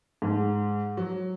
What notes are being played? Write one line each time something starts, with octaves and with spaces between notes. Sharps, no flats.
G#2
F#3